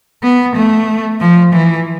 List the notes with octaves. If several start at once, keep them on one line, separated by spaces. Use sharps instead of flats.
B3
A3
F3
E3